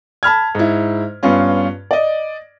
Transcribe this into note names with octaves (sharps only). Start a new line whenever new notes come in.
A5 B5 F6 G#6
G#2 E4
G2 B3 C#4 F4
D5 D#5